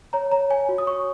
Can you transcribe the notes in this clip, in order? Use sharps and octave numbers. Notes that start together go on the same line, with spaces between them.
C#5 A#5
C#5 A#5
C#5 G#5
F#4
D#6
C#5 C#6